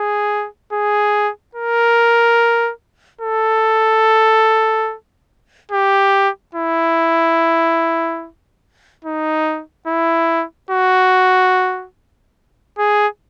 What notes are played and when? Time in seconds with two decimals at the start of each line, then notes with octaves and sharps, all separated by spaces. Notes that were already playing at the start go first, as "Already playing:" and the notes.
Already playing: G#4
0.73 G#4
1.55 A#4
3.21 A4
5.72 G4
6.55 E4
9.05 D#4
9.87 E4
10.71 F#4
12.78 G#4